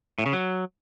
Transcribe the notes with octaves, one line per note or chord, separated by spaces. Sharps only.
A2
C#3
F#3